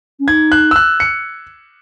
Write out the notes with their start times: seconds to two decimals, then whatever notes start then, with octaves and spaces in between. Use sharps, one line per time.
0.20 C#4
0.28 D#4 G#6
0.52 F#6
0.71 E6
0.76 F#6
1.00 C#7